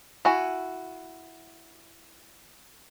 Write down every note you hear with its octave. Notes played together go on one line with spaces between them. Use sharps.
E4 F#4 G#5